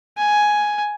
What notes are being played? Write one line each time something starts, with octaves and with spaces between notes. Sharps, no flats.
G#5